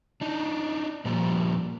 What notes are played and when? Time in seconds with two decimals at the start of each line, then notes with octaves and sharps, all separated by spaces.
0.21 D4 D#4
1.05 A#2 F3 G3 A#3